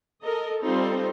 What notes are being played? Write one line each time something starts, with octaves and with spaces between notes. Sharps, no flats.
A4 A#4 D#5
G3 C4 D#4 F4 A4 C5